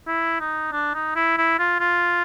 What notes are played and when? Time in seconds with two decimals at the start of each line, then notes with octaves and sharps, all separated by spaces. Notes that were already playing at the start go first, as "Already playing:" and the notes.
0.07 E4
0.40 D#4
0.72 D4
0.94 D#4
1.15 E4
1.38 E4
1.59 F4
1.80 F4